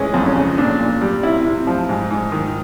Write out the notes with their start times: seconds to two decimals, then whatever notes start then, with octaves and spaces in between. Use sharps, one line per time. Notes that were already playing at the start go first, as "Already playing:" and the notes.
Already playing: E3 G#3 C#4
0.14 F2
0.25 C#4
0.36 C#3
0.58 A#2 D4
0.79 A#2
1.01 G3
1.23 C3 E4
1.45 C3
1.67 F3
1.89 G#2
2.10 G#2
2.32 D#3